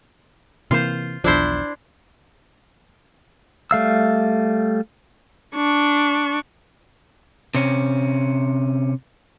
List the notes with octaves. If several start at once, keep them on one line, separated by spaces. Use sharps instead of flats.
C3 E3 A#3 F4 C5
B1 E2 F3 D4 E4 C5
G3 A3 F5 E6
D4 C#6
C3 C#4